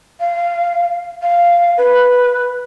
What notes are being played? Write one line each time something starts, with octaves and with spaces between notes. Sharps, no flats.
F5
F5
B4